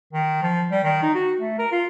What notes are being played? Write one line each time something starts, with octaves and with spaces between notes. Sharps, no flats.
D#3
F3
G3
D#3
D#4
F#4
A3
A#4
F4